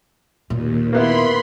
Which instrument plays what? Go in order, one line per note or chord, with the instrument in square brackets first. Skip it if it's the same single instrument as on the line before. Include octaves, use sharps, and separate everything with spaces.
[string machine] D#2 [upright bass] A#2
[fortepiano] A#3 B3 E4 [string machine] B5 C6